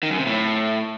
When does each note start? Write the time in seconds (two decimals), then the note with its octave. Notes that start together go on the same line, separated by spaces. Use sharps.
0.03 D#3
0.11 F#2
0.18 C3
0.26 A2